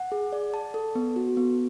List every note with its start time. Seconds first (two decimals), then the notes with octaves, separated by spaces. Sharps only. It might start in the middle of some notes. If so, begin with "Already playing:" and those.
Already playing: F#5
0.12 G#4
0.32 D5
0.54 A5
0.74 A4
0.95 B3
1.16 F#4
1.37 B3